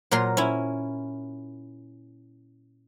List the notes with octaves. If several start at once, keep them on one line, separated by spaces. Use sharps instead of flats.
A#2 F#3 A#4 C6
C#4 E4